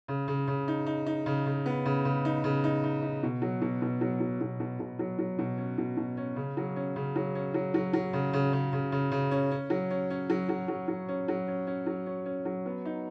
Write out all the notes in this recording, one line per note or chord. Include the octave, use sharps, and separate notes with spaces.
C#3
C#3
C#3
D#4
D#4
D#4
C#3
C#3
B3
C#3
C#3
D#4
C#3
D#4
D#4
D#4
B2
F#3
B2
B2
F#3
F#3
B2
B2
B2
F#3
F#3
B2
C#4
B2
B2
C#4
C#3
F#3
C#4
C#3
F#3
C#4
F#3
F#3
F#3
C#3
C#3
C#3
C#3
C#3
C#3
C#4
C#4
F#3
C#4
C#4
F#3
F#3
F#3
F#3
C#4
F#3
C#4
C#4
F#3
C#4
C#4
F#3
B3
D#4